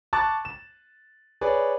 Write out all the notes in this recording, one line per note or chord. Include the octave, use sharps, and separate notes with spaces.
A5 C#6 D6 F#6 A6
E7
G#4 B4 C#5 D5